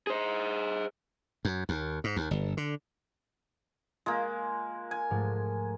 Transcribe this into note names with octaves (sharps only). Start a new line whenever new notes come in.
G#4 C5
F#2
D#2
G#2
D#2
G1
D3
G#3 A#3 F4
G#5
G#2 F3 A3